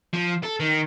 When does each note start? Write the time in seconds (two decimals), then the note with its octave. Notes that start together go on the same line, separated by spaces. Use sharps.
0.14 F3
0.43 A4
0.60 D#3